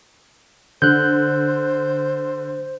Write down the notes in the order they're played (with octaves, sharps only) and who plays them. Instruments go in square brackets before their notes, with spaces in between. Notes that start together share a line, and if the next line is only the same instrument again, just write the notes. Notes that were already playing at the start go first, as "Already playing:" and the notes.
[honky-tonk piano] D3 [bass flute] C5 [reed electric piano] F#6 G6